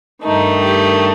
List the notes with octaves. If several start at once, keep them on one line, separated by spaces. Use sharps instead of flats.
G2 D#3 A3 D#4
G4